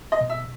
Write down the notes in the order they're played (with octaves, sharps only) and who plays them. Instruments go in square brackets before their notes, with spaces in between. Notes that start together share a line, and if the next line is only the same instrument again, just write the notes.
[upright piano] D#5
[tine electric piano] B2
[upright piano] E5